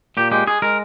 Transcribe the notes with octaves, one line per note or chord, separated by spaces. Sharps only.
A#2 G4
G#3 G4
G#3 G#4
G#3 A#4